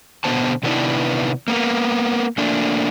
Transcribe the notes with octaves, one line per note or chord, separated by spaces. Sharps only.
B2 D3 D#3 B3 C5 A5
C3 D#3 B3 D4 E4 B4
A#3 B3 A#4
A3 A#3 D4